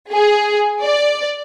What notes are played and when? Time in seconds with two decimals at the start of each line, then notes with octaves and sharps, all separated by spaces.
0.13 G#4
0.81 D5